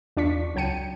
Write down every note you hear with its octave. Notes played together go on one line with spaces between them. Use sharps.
E2 D4 F4 C#6 B6
C#2 F#3 G5 A5 C#7 D#7